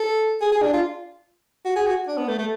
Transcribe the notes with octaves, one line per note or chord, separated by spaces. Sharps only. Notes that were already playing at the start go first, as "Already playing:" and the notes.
Already playing: A4
G#4
G#4
D4
F4
F#4
G#4
F#4
D4
B3
A3
A3